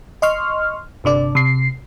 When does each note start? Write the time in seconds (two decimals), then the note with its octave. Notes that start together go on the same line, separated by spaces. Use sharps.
0.22 D#5 C6 C#6 F6
1.04 G1 C3 D4 D5
1.35 C3 C7